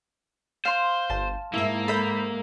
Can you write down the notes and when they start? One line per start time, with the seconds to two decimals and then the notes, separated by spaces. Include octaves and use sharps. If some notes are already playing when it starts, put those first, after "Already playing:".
0.65 C5 F5 C6
1.10 G1 A5
1.54 G#2 A#3 E4 E5
1.88 A4 E5 B5 G6